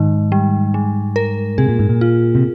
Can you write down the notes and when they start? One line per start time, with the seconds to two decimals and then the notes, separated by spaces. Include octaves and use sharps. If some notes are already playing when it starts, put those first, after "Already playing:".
Already playing: G#2 D#3
0.32 G3
0.74 G#3
1.16 A#4
1.58 C3 G#4
1.69 A#2
1.79 G#2
1.89 A#2
2.01 F4
2.35 C3